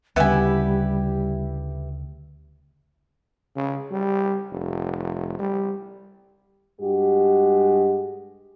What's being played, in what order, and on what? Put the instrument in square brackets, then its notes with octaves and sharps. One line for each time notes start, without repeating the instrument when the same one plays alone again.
[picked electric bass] D2 C#3 [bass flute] G3 [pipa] B3 G#5 [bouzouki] E4 G4 B4
[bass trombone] C#3
G3
F1
G3
[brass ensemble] G2 G#3 F#4 G4